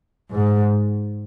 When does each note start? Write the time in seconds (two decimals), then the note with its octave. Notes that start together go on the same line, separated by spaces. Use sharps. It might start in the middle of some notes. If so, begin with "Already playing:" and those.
0.31 G#2